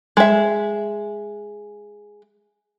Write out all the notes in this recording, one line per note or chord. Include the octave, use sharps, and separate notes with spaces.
G#3 E5